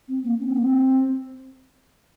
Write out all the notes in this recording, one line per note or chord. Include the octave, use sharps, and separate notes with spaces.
C4
A#3
C#4
C4
A#3
C4